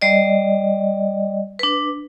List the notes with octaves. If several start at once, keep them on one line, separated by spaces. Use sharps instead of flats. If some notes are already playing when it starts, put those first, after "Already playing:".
G3 D5 D#5
D4 B4